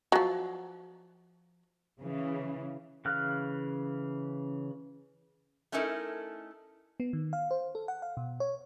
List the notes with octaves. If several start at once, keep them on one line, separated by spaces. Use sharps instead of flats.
F3 F#3
C#3 E3
C#3 E3 F5 F6 F#6
A3 C#4 D#4 E4 A4 A#4
B3
D#3
F5
C5
A4
F#5
F5
B2
C#5